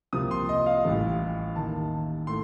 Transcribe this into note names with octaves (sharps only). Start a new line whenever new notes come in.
C2 C3 F3 A#3 D#6
C6
D#5
F5
A1 A2 G3
D#2 D#3 A#3 A5
A2 A3 C6